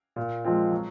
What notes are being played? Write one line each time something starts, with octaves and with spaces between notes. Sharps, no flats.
A#2
F3 G#3 C4 F4
F#3